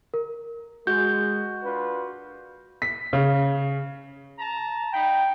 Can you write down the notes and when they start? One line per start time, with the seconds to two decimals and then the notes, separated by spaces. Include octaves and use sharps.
0.14 A#4
0.87 G#3 F#4 G6
1.64 D4 F4 B4
2.82 B6
3.13 C#3
4.38 A5 A#5
4.93 D#4 G5 B5